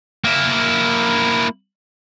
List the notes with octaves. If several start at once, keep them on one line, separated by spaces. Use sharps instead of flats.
A#3 E4